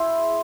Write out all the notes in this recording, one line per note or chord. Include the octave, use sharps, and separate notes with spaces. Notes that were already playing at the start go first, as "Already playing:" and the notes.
Already playing: E4 G#4 C5